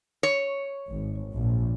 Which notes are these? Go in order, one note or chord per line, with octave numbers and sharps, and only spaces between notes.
C#5
G#1
A#1